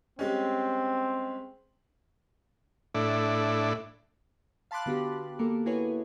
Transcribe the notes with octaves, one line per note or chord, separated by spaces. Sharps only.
G3 G#3 C4 C#4
A2 D4 E4
F5 A5 B5 C6 D6 F#6
D3 B3 F#4 G4
A#3 A4 A#4
E4 F#4 G#4 B4 C#5